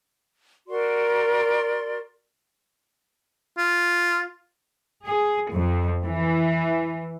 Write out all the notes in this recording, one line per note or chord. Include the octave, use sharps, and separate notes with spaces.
F#4 A#4 D5 C6
F4
G#4
F2
E3